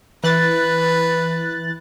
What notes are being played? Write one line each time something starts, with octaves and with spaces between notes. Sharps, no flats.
E3 B4 F#6 A6